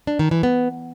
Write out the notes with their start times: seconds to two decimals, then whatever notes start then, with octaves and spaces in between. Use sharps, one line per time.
0.07 D4
0.19 D#3
0.31 E3
0.43 B3